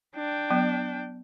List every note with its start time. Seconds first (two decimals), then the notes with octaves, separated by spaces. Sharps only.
0.15 D4 G5
0.51 F#3 B3